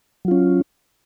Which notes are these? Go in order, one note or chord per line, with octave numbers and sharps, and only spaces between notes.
F#3 C#4 F4